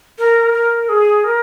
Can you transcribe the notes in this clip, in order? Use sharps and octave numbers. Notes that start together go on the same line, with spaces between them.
A#4
A#4
G#4
A#4